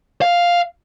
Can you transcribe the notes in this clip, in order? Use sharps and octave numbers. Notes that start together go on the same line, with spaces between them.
F5